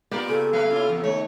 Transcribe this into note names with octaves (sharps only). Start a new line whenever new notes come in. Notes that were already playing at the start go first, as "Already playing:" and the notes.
A#3 B3 F4 G4 A#4 D5
C#3 A4
F#3 A3 B4 F5
C#4 E4 F4
E2
D#3 A3 C#5